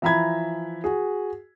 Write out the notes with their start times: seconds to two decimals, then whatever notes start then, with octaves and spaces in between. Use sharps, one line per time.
0.02 E3 F3 E5 A#5 B5 G#6
0.84 F#4 G#4